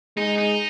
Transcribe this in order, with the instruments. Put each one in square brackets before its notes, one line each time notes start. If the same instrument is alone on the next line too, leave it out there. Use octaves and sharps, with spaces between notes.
[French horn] G#3 [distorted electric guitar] D#4
[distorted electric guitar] D#4